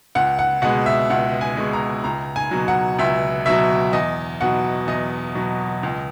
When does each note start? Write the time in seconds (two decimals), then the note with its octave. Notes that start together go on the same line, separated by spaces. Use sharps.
0.15 C#2 F#5
0.39 F#5
0.62 B2 G#3 F#5
0.86 E5
1.10 C#2 F#5
1.41 G#5
1.57 B2 G#3
1.73 A#5
2.04 C#2 A#5
2.36 G#5
2.51 B2 F#3
2.68 F#5
2.98 C#2 E5
3.46 B2 F#3 E5
3.93 E2 D#5
4.41 B2 F#3 F#5
4.88 E2 D#5
5.35 B2 F#3
5.83 C#2